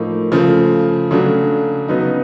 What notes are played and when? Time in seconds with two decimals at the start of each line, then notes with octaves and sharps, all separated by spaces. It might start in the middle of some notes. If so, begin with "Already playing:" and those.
Already playing: A2 F3 A#3 D#4
0.32 C#3 F3 A3
1.11 C#3 F#3 A3 D4
1.88 C#3 F#3 B3 D#4